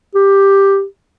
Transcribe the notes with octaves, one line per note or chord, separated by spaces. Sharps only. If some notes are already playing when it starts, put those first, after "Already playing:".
G4